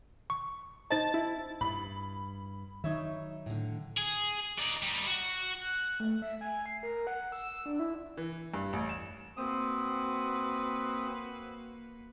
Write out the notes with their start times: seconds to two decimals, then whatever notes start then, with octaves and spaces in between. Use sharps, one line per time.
0.30 C#6
0.91 D#4 C5 D#5 A5 A6
1.14 E4
1.61 G2 B5
2.84 D#3 F#3 D#4 C#5 E5
3.46 A2 D3
3.97 G#4
4.59 D#4 D5
4.83 G3 D#4
5.07 F#4
5.61 F#6
6.00 A3
6.22 E5
6.41 G#5
6.66 C7
6.83 A#4
7.07 F#5
7.32 E6
7.66 D4
7.80 E4
8.17 E3
8.54 G2
8.73 A1
8.89 E7
9.37 A#3 C4 F#4 B4 D#6